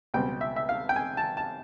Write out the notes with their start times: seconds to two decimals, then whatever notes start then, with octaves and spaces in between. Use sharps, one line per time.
0.14 C#2 B2 G3 C4 G5
0.41 E5
0.56 E5
0.69 F5
0.89 G5
0.96 G#5
1.17 A5
1.37 A5